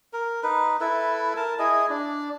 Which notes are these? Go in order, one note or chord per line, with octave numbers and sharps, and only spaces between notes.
A#4
D#4 B4
E4 A4 B4
A#4 A5
E4 G#4 D#5
D4